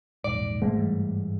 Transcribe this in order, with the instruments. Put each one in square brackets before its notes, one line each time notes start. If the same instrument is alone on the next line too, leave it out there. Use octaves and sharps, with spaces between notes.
[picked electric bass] E1 A#1 G#2 [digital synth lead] D5
[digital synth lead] G#2 [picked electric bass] B2 A#3 [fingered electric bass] A3
[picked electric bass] G2 E3 G3